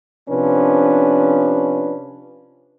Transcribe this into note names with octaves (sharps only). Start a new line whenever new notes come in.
C3 F3 C#4 D4 B4